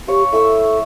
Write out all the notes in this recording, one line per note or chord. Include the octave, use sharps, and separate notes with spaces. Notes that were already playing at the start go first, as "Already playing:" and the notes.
G4 C#5 F5
E4 A4 C#6 E6